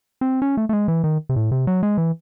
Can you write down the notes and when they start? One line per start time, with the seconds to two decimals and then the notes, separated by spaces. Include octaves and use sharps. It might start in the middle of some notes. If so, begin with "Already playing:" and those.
0.21 C4
0.42 C#4
0.57 A3
0.69 A3
0.73 G#3
0.88 E3
1.04 D#3
1.29 C3
1.36 A2
1.51 C3
1.67 F#3
1.83 G#3
1.98 E3